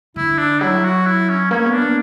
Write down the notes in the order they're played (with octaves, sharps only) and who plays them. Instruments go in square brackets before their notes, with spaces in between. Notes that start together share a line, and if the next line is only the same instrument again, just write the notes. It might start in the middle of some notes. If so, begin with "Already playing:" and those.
[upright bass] D3 [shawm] E4
[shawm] D4
[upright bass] F#3 [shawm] E4
[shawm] F#4
E4
C#4
[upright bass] A#3 [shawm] C#4
[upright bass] B3
[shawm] D4
[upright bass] A#3